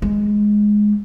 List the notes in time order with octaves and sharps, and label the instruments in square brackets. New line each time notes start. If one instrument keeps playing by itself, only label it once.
[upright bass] G#3